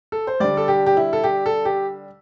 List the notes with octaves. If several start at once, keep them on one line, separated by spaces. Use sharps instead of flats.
A4
C5
D3 G3 D5
A4
G4
G4
E4
A4
G4
A4
G4